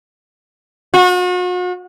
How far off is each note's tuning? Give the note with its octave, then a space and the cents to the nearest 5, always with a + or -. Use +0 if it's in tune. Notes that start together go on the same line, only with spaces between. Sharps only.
F#4 -40